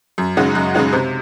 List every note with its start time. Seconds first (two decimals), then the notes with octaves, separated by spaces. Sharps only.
0.18 F#2
0.37 C#3 G#3 D#4 F#4
0.55 F#2
0.75 C#3 G#3 D#4 F#4
0.93 C3